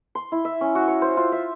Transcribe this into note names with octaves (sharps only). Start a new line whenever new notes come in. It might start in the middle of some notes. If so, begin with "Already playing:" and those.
C6
E4
E5
C#4
F#4
C#5
C5
F4
E5